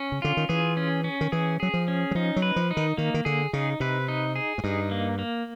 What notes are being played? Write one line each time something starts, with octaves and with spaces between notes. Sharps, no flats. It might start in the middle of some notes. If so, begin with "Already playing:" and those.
Already playing: C#4
C#3
D3 F4
D#3
E3 G#4
C#4
C#4
D#3
E3 G#4
F#3 G#4
F3
C#4
F#3
F3 D#4
F#3
B4
F3
D#4
D#3
D#3 A#3
D#3
D3 G#4
C#3 D#4
C3 B4
D#4
G#4
G#2
G2 D#4
A#3
A#3